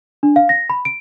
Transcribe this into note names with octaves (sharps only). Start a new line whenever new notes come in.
D4
F5
A#6
B5
D7